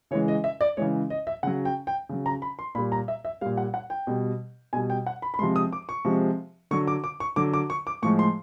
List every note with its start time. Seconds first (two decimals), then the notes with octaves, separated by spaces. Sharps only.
0.11 C#3 E3 G#3 C#5
0.28 D#5
0.44 E5
0.61 D5
0.77 C#3 E3 G#3 C#5
1.10 D#5
1.27 E5
1.43 C#3 F#3 F#5
1.65 G5
1.87 G5
2.09 C#3 F#3
2.26 A#5
2.42 B5
2.59 C6
2.75 A#2 B5
2.78 G3
2.92 A#5
3.08 E5
3.25 E5
3.41 A#2 G3 F5
3.57 F#5
3.74 F#5
3.90 G5
4.07 B2 G3
4.73 B2 G3 G#5
4.90 G5
5.06 F#5
5.22 B5
5.34 B5
5.39 C3 F3 G#3 C6
5.56 D#6
5.73 D6
5.89 C#6
6.05 C3 F3 G#3
6.71 D3 F#3 C#6
6.87 D6
7.04 D6
7.20 C#6
7.36 D3 F#3 D6
7.54 D6
7.70 C#6
7.87 D6
8.02 A2 F3 G#3 C#6
8.19 C6